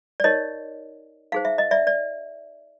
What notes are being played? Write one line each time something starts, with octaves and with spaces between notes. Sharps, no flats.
D5
D#4 G4 A#4 C#5 D#5
D#4 G#4 C5 F5
E5
D#5
D5 E5
D5